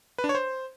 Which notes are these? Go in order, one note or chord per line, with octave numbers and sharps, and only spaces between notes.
B4
D4
C#5
C5